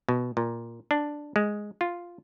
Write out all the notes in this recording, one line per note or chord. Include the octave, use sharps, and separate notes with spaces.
B2
A#2
D4
G#3
F4